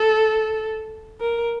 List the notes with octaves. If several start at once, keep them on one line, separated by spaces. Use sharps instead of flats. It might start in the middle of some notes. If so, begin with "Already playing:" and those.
Already playing: A4
A#4